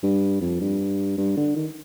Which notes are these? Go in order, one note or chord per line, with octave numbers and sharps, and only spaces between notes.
G2
F2
G2
G2
D3
D#3